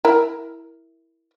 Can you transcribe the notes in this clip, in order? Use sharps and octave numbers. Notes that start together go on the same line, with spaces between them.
E4 A#4